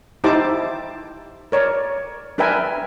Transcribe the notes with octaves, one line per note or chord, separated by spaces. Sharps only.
D#4 E4 G4 C5 A5 D6
A#4 C#5 D5
D4 A#4 B4 E5 G5 G#5